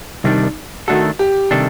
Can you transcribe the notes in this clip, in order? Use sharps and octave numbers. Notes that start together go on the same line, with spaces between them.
C2 C3 D#3 G3 D4 D#4
D#3 A3 D4 F#4 A4
G4
C3 D#3 G3 D4 A4